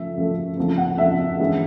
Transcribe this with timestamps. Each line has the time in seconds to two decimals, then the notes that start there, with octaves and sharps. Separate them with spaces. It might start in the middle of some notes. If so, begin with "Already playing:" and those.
Already playing: C#3 F3 A3 E5
0.15 C#3 F3 A3
0.57 C#3 F3 A3 C4
0.78 F#5
0.98 C#3 F3 A3 C4 E5
1.40 G2 E3 G#3 C#4